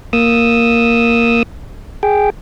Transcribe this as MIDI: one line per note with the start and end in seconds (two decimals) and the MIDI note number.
0.13 1.43 58
0.13 1.43 87
0.13 1.43 88
2.03 2.30 68
2.03 2.30 79